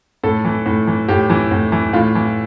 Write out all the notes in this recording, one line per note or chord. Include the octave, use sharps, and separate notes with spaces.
A2 A4
E3
A2
E3
A2 G4
E3
A2
E3
A2 F4
E3